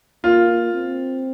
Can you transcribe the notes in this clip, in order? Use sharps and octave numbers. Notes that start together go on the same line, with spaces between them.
A#3 F4
C4